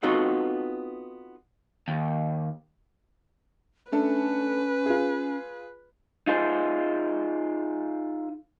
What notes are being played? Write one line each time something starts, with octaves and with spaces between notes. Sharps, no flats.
B3 C4 D#4 F4 F#4 A4
D#2
A3 C#4 D4 A4 B4
F4 G#4
D#4 F4 G#4 C5